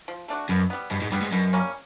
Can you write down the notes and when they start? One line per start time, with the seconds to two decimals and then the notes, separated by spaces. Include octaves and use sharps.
0.08 F3
0.28 A3 D4 F#4
0.49 F#2 B2
0.70 G3 B3
0.90 G2 B2
1.02 G#2
1.12 G2 G3 B3
1.22 G#2
1.32 F#2 B2
1.53 G3 A#3 C#4